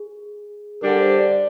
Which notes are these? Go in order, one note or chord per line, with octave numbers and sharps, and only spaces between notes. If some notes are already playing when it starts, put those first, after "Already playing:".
Already playing: G#4
D3 G3 D4 A#4
C5
D5